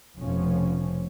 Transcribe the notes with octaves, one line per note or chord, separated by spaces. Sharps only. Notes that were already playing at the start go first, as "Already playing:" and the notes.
F1 B2 F3 C#4